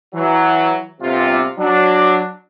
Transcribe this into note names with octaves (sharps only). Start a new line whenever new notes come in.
E3 F#3
G1 C3 F4
F#3 D4